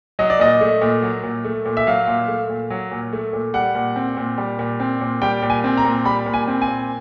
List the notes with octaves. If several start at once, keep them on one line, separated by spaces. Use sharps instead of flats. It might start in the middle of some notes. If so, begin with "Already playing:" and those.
F#3 D#5
D5
A#2 D#5
A3
A#2
F#3
A#2
A3
A#2
E5
F#3 F5
A#2
A3
A#2
F#3
A#2
A3
A#2
G3 F#5
A#2
C4
A#2
G3
A#2
C4
A#2
G3 G5
A#2
G#5
C4
A#5
A#2
G3 B5
A#2
G#5
C4
G#5
A#2